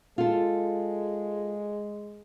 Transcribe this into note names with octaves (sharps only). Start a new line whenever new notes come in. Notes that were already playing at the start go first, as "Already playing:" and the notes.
G#3 F4 A4